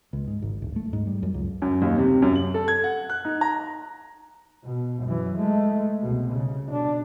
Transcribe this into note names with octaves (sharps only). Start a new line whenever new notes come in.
C#2
G#2
G#1
D1
A3
G#2
G3
F#2
C#2
F#2
D#2
C3
F#2
F#7
A4
G#6
F#5
F#6
D#4
A#5
B2
F#2 E3
G#3 A3
C2 B2
C#3
B2 D4